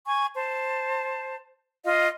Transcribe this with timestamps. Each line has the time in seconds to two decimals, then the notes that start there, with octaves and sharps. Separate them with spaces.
0.06 G#5 C#6
0.34 C5 A5
1.85 F4 D#5 F5